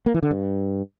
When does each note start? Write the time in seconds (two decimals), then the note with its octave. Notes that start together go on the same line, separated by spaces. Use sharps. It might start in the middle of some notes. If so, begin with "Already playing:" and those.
0.06 A#3
0.14 E3
0.23 D3
0.31 G2